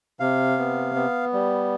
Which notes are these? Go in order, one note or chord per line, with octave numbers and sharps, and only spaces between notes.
C3 F5
B3
B3
G3